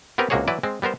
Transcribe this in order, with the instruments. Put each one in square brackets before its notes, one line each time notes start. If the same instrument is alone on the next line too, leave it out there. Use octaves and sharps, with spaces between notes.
[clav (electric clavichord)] B3 C4 G4 A#4 B4
C#2 C3 A#3 F#4 G#4 C#5
E3 F#3 E4 B4 D5
G#3 C4
G3 B3 A#4 C5